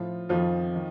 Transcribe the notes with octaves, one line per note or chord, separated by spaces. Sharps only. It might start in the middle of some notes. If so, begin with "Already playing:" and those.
Already playing: A2 F3 F4
F2 D#3 F3 F4
D#3